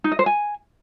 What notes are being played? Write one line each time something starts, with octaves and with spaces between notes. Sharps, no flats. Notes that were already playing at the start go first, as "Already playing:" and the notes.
D#4
D#5
C5
G#5